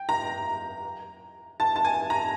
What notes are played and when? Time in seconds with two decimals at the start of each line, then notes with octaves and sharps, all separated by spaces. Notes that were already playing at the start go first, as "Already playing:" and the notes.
Already playing: G5
0.09 A#5
1.60 A5
1.76 A5
1.85 G#5
2.10 A#5